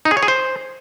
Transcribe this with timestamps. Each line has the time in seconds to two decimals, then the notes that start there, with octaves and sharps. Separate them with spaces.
0.05 D#4
0.11 G#4
0.17 C#5
0.23 G#4
0.28 C5